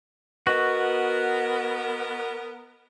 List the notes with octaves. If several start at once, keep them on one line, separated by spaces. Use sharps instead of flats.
B3 F#4 A#4 B4 D#5 F#5